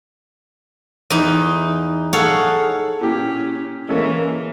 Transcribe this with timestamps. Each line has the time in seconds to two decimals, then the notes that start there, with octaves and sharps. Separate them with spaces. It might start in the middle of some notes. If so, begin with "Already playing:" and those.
1.10 E2 D#4
2.13 G#4 A4 C#5 F5 F#5
3.01 A#2 C#4 E4 G4
3.89 E3 G#3 A#3 C#4 A4